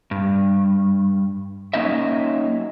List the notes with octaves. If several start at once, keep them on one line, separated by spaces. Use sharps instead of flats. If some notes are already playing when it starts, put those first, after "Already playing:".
G2
F#3 A#3 C#4 D#4 D#5 E5